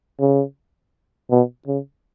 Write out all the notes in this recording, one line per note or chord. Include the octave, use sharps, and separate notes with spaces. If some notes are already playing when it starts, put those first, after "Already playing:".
C#3
B2
C#3